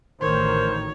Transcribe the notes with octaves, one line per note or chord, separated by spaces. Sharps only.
A1 D2 D#3 A#4 C5 C#5